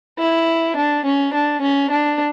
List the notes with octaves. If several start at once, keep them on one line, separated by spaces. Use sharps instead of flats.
E4
D4
C#4
D4
C#4
D4